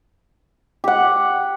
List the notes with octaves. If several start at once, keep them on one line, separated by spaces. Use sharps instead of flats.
G4 F#5